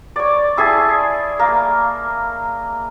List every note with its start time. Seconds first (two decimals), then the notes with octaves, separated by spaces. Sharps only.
0.16 C#5 D5
0.57 E4 G#4 G#5 A5
1.39 A#3